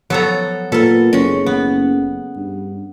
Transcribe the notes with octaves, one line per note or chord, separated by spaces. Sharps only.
F3 F#3 B3 A4 A#5
A#2 B3 A4 A#4
F#1 G#3 C#4
B3
G2